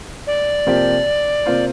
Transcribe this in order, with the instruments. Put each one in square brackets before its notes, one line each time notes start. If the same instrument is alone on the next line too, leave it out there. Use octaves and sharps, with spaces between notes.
[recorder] D5
[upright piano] C3 F3 A#3 G4 C5
C3 A#3 F4 C5